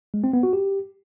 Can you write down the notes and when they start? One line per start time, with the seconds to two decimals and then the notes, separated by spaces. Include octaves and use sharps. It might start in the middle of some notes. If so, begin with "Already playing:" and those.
0.14 G#3
0.24 C4
0.33 B3
0.43 F#4
0.53 G4